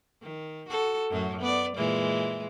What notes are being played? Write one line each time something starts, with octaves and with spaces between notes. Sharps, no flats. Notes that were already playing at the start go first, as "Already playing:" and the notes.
D#3
F#4 A4
F#2 A2 F#3
B3 D5
A#2 E3 G#3